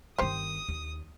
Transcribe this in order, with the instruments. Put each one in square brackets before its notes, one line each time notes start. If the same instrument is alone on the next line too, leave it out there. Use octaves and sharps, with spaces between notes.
[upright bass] G1 D#3 [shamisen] G4 C5 [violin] D#6
[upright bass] D#2